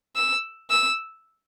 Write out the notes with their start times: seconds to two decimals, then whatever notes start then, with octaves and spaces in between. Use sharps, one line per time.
0.16 E6
0.70 E6